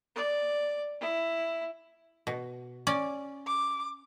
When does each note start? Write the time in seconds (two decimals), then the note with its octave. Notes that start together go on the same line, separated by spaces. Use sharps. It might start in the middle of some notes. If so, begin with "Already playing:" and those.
0.15 D5
1.01 E4
2.27 B2
2.87 C#4 D5
3.47 D6